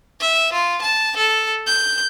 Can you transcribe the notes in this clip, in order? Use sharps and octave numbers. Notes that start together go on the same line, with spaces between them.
E5
F4
A5
A4
G6